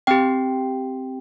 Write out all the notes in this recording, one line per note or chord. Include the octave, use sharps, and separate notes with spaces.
C4 G4 G5